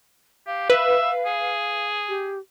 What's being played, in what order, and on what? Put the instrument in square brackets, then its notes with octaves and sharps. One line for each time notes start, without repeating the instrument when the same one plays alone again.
[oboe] G4 [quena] F5
[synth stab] B4 [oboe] E5
[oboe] G#4
[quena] G4